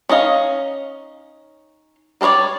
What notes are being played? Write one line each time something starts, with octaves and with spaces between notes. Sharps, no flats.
C#4 D#4 D#5 F5
G3 A4 A#4 C#5 D5